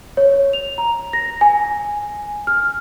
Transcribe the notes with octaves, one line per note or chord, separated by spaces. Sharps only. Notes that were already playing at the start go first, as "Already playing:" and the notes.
C#5
F7
A#5
A#6
G#5
F6